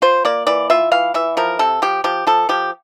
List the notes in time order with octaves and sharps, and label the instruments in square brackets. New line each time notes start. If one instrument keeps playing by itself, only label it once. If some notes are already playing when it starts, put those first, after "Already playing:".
[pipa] F4 C5
A#3 D5
E3 D5
F4 E5
E3 F5
E3 E5
F3 A#4
C3 A4
F3 G4
F3 G4
F3 A4
F3 G4